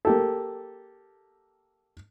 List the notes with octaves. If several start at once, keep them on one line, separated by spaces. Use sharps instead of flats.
A#3 G4 A4